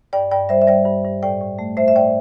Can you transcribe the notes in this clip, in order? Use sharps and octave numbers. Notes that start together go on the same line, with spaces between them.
G2 D5 G5
G2 D5 G5
G3 C5 E5
E5
G3 D5 G5
G2
G2
A2 D5 G5
A2
A3
A3 C5 E5
E5
A2 D5 G5